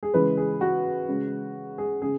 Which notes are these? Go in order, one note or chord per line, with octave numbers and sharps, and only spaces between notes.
G#4
C#3 E3 G#3 B4
G#4
F#4
C#3 G#3
G#4
C#3 G#4